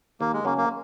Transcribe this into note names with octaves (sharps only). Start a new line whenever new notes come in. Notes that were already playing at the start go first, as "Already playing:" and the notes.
D#2 A#3
G#3
C#3 F#3 A#3 C#4
A#3